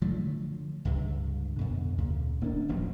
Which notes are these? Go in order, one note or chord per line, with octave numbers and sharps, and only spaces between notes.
D3 F3 F#3 A3
C#2 G2 C3
F2 B2 D3
D2 A#2 C#3
D#1 A#3 C#4 D4
D1 A1 F3 F#3